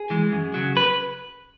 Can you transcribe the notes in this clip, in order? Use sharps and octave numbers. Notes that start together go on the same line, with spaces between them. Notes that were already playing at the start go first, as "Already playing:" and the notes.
Already playing: G#4
E3 G#3
F#2
C#3 F#3
B4